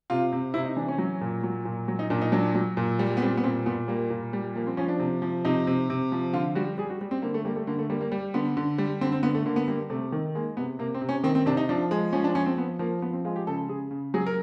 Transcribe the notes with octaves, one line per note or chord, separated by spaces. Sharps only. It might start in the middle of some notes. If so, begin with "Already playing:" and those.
C3 F4
C3
C3 E4
D#4
E3 D4
C#4
F#3
A#2
F#3
A#2
F#3
D#4
A#2 D4
D#4
F#3 D4
F#3
A#2
G3
B3
G3 C4
B3
A#2 C4
A#2 B3
G3 A#3
A#2
G3
F3 A#3
C4
F3 C#4
D4
C3
F3
C3 D#4
C3
C3
F3
D3 F4
G3 F#4
G3 G#4
F#4
G3
C4
D3 A#3
A3
G3 A#3
A3
D3 A#3
A3
G3 A#3
A#3
G3
D3 B3
D3
G3
D3 C4
C4
D3 B3
A3
D3 A#3
B3
G3 A#3
C3 A3
D#3
G#3 A#3
C3 B3
C3 A#3
C4
C3
C#4
D#3 C4
C4
C3 D4
D#4
F3 D4
G#3
F3 C#4
D4
F3 C#4
C4
F3 B3
F3 A#3
F3 B3
C4
G#3 F4
G4
C#3 A4
C#3 G#4
C#3
F#3 G#4
A#4